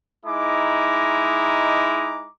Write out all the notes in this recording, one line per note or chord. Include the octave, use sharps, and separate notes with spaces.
G#3 D#4 E4 A#5 D6